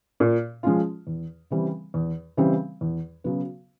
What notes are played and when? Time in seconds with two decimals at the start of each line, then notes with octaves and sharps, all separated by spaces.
0.20 A#2
0.63 F3 G#3 C#4 F4
1.07 E2
1.50 C#3 E3 G3 C4
1.94 E2
2.37 C#3 E3 G3 C4
2.81 E2
3.24 C#3 F#3 B3